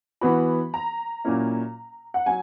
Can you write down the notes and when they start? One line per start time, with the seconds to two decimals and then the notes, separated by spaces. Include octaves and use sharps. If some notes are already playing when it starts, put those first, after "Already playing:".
0.21 E3 B3 F#4 B5
0.74 A#5
1.24 A#2 F#3 A#3 C#4 E4
2.14 F#5
2.26 F#3 G#5